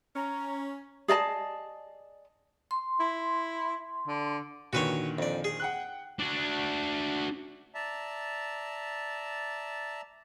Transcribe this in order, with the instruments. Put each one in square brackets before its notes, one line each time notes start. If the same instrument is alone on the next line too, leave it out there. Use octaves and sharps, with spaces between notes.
[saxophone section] C#4 [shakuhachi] A#5
[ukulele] G#4 D5 D#5 A5
[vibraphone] C6
[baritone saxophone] E4
D3
[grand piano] A#2 D3 D#3 [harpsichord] F#4 B4 C#5
[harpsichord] F2 D5
G#4
[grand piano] F#5 G5 F#6
[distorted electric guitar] D4 F#4
[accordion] D5 E5 A5 A#5